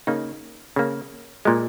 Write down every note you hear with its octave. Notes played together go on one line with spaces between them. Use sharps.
C#3 A#3 D#4
C#3 A#3
A#2 G#3